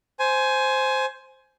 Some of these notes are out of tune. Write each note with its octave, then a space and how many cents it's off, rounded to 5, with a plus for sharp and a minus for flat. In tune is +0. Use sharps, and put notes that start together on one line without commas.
C5 +0 G#5 +15